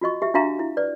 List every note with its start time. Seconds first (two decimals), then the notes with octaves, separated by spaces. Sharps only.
0.01 F4 F#4 D#5 C#6
0.22 G4 E5
0.34 D4 F#4 E5 F5 A#5 C#6
0.59 E4
0.77 B4 D5